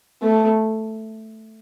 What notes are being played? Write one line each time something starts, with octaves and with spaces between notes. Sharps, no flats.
A3